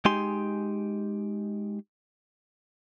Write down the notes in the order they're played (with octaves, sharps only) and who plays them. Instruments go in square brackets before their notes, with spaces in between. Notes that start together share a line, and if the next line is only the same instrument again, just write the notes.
[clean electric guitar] G#3 D#4 G4 G#5 C6